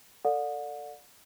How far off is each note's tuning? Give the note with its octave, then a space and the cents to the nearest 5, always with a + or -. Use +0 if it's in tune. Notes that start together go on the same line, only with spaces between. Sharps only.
A4 +25 D5 +0 F#5 -40